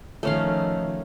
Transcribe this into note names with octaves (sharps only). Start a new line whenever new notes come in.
D#3 F3 A3 C#4 F5